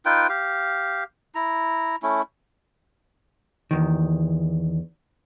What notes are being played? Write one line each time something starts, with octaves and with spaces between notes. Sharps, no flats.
D#4 F4 B4 G5
G4 F5
E4 A#5
A3 C#4 E4
E2 D#3